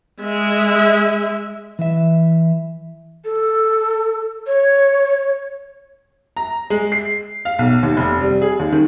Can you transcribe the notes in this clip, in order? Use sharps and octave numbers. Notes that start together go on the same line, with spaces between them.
G#3 E5
E3 E5
A4
C#5
A#5
G#3
C7
F5
B1
D#2
F1
G3
G#4
D#2
D#3